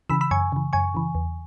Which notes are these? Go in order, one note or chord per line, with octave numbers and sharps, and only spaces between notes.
C#3 E3 B5 E6
B5 E6
F#2 G#5 C#6
C#3 E3
F#2 G#5 C#6
C#3 E3
E2